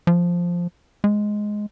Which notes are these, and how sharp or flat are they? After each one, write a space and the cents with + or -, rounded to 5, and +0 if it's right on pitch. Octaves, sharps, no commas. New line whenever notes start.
F3 +0
G#3 +5